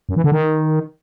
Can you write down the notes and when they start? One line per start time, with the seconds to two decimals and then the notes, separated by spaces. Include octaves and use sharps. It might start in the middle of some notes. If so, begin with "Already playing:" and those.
0.09 F#2
0.16 E3
0.24 D3
0.32 D#3